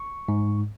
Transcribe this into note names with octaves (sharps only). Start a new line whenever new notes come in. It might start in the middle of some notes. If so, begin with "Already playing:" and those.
Already playing: C#6
G#2